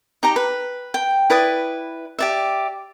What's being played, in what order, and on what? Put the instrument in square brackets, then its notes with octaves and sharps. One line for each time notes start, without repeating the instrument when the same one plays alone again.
[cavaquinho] D#4 G4 A#5
B4
G5
E4 B4 D5 D#6
G4 D5 E5